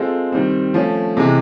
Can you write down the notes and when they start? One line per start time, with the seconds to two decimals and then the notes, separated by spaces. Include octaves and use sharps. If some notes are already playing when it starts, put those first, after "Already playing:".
Already playing: G#3 C4 F4 A4
0.32 D#3 G3 C4
0.74 F3 A3 C#4
1.17 C3 E3 G#3